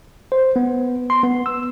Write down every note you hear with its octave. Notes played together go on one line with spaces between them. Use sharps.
C5
B3
C6
B3
E6